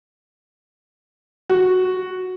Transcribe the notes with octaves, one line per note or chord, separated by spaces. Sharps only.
F#4